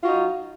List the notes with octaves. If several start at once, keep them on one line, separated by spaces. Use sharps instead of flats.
F#3 D#4 F4 F#4